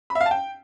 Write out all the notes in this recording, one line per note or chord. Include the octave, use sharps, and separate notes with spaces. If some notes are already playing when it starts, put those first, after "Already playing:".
B5
E5
F5
A5
G5